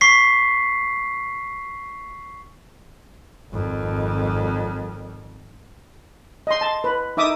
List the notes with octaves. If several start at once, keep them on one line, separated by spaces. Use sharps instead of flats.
C#6 B6 C7
G#1 F2
D#5 C6
A5
B4
D#4 E5 D6 D#6